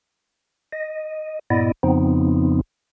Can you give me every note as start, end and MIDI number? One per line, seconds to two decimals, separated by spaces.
0.72 1.39 75
1.50 1.72 43
1.50 1.72 46
1.50 1.72 59
1.50 1.72 64
1.50 1.72 74
1.50 1.72 75
1.83 2.61 41
1.83 2.61 49
1.83 2.61 53
1.83 2.61 59
1.83 2.61 60
1.83 2.61 63